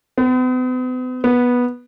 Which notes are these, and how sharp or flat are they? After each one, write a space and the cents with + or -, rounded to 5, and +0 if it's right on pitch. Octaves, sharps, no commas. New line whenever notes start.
B3 +45
B3 -10